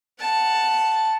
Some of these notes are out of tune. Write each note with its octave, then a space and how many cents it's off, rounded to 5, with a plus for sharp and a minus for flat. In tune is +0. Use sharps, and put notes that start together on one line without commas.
F#5 +0 A5 +0